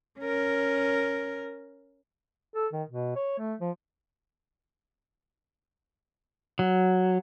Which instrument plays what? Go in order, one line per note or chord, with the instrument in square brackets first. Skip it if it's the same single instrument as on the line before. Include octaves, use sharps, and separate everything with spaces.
[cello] C#4 A#4
[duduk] A4
D#3
B2
C#5
A3
F3
[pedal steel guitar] F#3